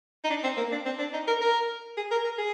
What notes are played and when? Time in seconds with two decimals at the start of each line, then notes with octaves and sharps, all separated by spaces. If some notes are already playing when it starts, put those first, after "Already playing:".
0.24 D#4
0.30 D4
0.43 C4
0.57 A#3
0.72 D4
0.86 C4
0.99 D4
1.13 D#4
1.28 A#4
1.41 A#4
1.97 G#4
2.11 A#4
2.25 A#4
2.38 G#4